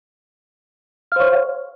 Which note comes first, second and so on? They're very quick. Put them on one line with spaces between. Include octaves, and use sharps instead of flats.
F5 C5 C#5